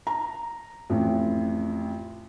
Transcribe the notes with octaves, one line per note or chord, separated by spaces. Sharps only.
A#5
A1 F2